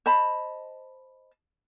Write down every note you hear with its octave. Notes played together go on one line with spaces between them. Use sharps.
C5 D#5 A5 B5